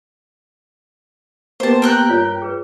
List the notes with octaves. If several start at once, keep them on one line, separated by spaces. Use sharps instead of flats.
A#3 B3 G4 C5 A5
A#4 G5 F#6
G2 F4 C#5
G#4 B4